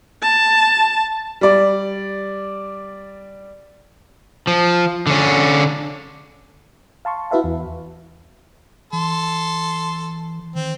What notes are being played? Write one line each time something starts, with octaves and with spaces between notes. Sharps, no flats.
A5
G3 D5
F3
D3 C#4
F5 A5 C6 C#6
E4 F#4 B4 E5 F5 A5
E2
E3 A4 C6
D#3 C4